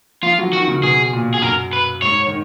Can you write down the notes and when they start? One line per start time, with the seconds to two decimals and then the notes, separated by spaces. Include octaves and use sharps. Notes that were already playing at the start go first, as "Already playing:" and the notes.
0.23 F3 F4
0.39 F#3
0.52 D#3 F#4
0.67 C#3
0.82 B2 G#4
1.13 A#2
1.34 G#4
1.42 F#2 A#4
1.73 B4
2.02 G#2 C#5
2.27 D#3